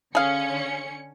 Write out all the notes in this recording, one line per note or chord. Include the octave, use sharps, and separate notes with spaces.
D3 C#4 G#4 F5 C#7